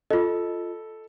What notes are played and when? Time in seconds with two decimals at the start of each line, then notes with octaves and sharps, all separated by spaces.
0.10 F4 A4 D#5